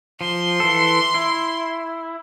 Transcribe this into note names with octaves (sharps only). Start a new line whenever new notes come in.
F3 C6
E3 A4
E4